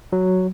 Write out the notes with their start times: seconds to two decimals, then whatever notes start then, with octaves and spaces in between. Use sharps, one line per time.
0.13 F#3